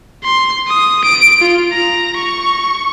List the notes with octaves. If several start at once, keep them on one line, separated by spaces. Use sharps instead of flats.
C6
D#6
D7
F4
A#5
C#6